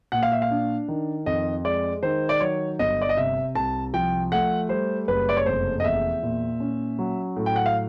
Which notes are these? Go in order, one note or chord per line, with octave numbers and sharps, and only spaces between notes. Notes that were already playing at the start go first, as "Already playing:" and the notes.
A#2 F#5
F5
E5
F5
D4
D#3
F2 D#5
G#3 D5
D#3 C5
D5
F#3 C#5
G1 D#5
D5
D#5
C3 E5
C2 A5
F3 G5
A3 F#5
G3 C5
F#1 B4
D5
C#5
F1 C5
D#5
E2 E5
A#2
C#4
F#3
A2
G5
F#5
F5